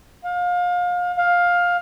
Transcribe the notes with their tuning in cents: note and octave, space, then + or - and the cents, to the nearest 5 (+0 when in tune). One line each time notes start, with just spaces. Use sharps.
F5 +30
F5 +15